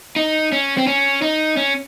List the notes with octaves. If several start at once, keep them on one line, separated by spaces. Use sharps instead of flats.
D#4
C#4
C4
C#4
D#4
C#4